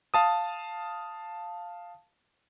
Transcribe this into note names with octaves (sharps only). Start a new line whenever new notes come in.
F5 A5 D#6